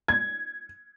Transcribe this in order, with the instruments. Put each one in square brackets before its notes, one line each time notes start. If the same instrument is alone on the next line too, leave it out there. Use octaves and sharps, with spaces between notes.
[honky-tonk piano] G#6